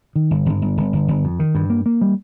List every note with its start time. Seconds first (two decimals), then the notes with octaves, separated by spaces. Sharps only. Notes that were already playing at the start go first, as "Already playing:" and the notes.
0.16 D#3
0.31 G1
0.46 G1
0.62 G1
0.77 G1
0.93 G1
1.08 G1
1.24 F2
1.39 D#3
1.55 G2
1.70 A#3
1.86 A#3
2.02 G3